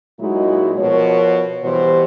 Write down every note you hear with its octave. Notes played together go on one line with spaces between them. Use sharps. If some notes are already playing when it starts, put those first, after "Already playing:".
A#2 F#3 G#3 D#4 E4 F#4
B2 F3 A#4 C#5
B2 E3 G3 G4 C5